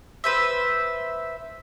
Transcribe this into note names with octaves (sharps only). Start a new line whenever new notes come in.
B4 C5 E5